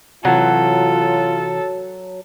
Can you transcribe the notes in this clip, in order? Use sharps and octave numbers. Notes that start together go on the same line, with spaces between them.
C3 E3 F#3 F4 A4